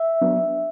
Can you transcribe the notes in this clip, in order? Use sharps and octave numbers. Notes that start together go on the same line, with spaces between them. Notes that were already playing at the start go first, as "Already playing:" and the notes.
Already playing: E5
F#3 B3 D4